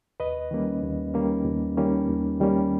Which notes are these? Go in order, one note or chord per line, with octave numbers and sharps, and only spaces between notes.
D#2 B4 D#5
D#3 G3 A#3 C#4
D#2
D#3 G3 A#3 C#4
D#2
D#3 G3 A#3 C#4
D#2
D#3 G3 A#3 C#4